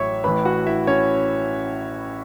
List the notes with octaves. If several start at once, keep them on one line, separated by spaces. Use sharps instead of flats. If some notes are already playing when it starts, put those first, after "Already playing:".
Already playing: A1 A2 F#3 C#5 E5 C#6
A1 A2 E3 B4 B5
F#4 F#5
E4 E5
C#4 C#5